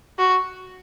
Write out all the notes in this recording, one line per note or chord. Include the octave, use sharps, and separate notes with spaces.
F#4